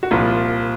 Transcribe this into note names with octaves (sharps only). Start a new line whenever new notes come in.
F#4
C2 A#2 F3 F4